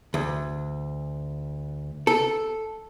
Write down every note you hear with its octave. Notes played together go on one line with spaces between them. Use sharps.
D2
A4